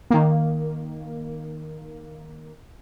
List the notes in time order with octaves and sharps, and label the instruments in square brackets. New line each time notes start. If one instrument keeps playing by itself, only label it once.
[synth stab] D#3 A#3